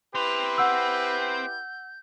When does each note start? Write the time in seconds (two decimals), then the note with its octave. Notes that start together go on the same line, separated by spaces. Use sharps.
0.15 C4 E4 G4 B4 C5 F7
0.58 F#5 E6 G6